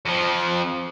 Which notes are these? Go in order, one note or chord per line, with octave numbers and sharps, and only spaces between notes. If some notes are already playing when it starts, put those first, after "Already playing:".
F2 F3